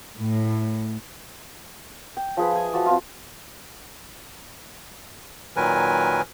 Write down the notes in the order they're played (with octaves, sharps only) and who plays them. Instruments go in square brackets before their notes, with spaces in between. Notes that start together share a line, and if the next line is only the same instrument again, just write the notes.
[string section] A2
[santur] G5
F3 G#4 B4
E5 G#5
F3 F#4 A5 D6
C4 F4
[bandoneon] A#2 D#3 F#3 A#4 B4 G#5